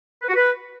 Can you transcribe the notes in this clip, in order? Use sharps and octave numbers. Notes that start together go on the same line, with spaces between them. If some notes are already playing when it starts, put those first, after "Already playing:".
B4
F#4
B4